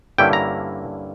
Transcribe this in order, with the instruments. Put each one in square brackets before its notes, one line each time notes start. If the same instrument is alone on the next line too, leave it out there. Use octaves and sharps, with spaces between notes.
[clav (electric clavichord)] G2 D3 A#3 C#4 E4 G5
A#5